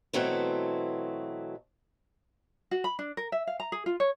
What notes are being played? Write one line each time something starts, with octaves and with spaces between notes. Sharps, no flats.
B2 E3 F#3 A3 C4
F#4
B5
D4
A#4
E5
F5
A#5
G#4
F4
C#5